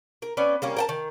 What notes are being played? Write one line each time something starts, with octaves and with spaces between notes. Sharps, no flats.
A#4
B3 C#4 D5
G3 A#3 C#4
A#4 G5 A5
D#3